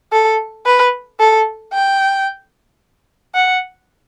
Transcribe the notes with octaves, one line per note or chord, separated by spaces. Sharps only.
A4
B4
A4
G5
F#5